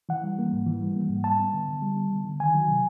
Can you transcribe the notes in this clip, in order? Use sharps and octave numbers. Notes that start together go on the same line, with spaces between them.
E3 F#5
G3
A#3
G#2
E3
G3
A#3
G#2
G3 A5
B3
D3
D3
G3
B3
D3
D3
D#3 G#5
F#3
C3